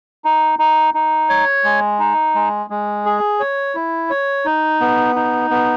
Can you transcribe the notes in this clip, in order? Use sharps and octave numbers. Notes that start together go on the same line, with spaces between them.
D#4
D#4
D#4
C#5
G#3
D#4
G#3
G#3
G#4
C#5
E4
C#5
D#4
B3
D#4
B3